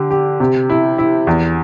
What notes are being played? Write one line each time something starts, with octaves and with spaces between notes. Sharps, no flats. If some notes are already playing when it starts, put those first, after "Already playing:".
Already playing: D3 G4
G4
C3
E4
E4
E2